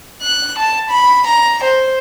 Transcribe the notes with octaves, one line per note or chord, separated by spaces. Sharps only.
F#6
A5
B5
A#5
C5